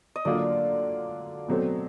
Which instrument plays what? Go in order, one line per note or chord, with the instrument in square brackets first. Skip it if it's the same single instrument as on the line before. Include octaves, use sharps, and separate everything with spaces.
[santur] D#5
[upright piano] D3 F#3 A#3 D4 F4 [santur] D5
[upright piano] B2 F#3 A3 C4